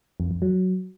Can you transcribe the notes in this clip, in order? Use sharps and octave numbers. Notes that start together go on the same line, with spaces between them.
F2
F2
F#3